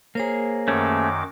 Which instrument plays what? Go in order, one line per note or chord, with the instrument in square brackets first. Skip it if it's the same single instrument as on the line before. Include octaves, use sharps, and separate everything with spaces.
[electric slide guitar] A#3 G#4 [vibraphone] C5 C#5 A#5
[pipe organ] F#2 D#3 D6 [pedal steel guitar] A3 C#4